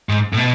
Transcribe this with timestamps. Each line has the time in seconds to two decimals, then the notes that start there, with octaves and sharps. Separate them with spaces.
0.09 G#2
0.33 A2
0.37 B2